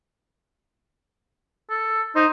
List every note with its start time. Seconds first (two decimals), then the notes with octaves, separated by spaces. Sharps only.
1.70 A4
2.16 D#4 C5